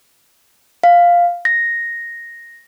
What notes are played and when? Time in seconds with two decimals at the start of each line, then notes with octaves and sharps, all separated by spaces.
0.84 F5
1.45 A#6